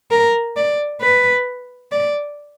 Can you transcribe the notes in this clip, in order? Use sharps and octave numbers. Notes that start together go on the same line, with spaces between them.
A#4
D5
B4
D5